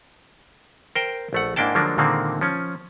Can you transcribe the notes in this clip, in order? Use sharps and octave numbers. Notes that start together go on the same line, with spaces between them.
A#4 C5 G5
A#1 A3 F#5
G#2 A#3 D4 E4 G5 A5
D3 F3 F#3 G#3 A#3 D4
A#2 D3 D#3 G#3 A#3 C4
F3 C#4